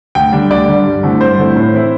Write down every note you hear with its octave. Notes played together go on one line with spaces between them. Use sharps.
D2 G5
D3 G3 D4
D2 D5
D3 G3 D4
G2
D3 A3 C4 E4
G2 C5
D3 A3 C4 E4
A2
E3 C4 E4